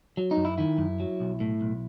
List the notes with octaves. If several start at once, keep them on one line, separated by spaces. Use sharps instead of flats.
F#3
D#4
F#2
E4
D#3 E4
F#2
F#3
B1
A2
B1